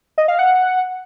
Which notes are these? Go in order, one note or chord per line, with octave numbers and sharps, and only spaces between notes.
D#5
F5
F#5